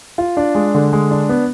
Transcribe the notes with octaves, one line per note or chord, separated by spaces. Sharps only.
F4
D4
G#3
D3
G#3
D4
B3